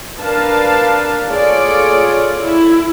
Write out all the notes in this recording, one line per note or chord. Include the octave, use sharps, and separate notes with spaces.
D4 A#4 B4 F5 A5
F4 G#4 A4 C#5 D5
E4